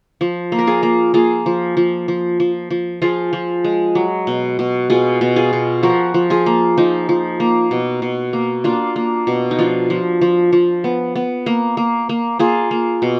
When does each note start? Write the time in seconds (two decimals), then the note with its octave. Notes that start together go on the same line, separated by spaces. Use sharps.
0.21 F3
0.52 A#3
0.59 A#4
0.67 F4 G#4
0.83 A#3
1.14 A#3 F4 G#4
1.46 F3
1.77 F3
2.08 F3
2.40 F3
2.70 F3
3.02 F3 F4 G#4
3.33 F3
3.64 G#3
3.95 F#3
4.27 B2
4.59 B2
4.90 B2 F4 G#4
5.21 B2
5.36 F4 G#4
5.53 B2
5.83 F3 F#4 A#4
6.14 F3
6.30 F4 G#4
6.46 A#3
6.78 F3 D#4
7.09 F3
7.40 A#3
7.71 B2
8.02 B2
8.33 A#3
8.64 A#3 D4 F4
8.96 A#3
9.27 B2
9.51 D#4
9.59 F3 D4 F4
9.90 F3
10.21 F3
10.52 F3
10.84 B3
11.15 B3
11.46 A#3
11.77 A#3
12.09 A#3
12.39 A#3 F4 G#4
12.71 A#3
13.02 B2